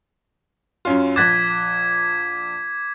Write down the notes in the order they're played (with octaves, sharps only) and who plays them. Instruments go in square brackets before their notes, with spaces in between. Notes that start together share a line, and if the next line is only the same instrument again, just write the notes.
[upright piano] F#2 C#4 F4
[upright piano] A#1 F#6 A6 [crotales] D6 G#6 B6